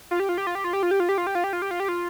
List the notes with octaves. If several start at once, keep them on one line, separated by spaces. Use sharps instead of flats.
F4
G4
F4
G4
F4
G4
F4
G4
F4
G4
F4
G4
F4
G4
F4
G4
F4
G4
F4
G4
F4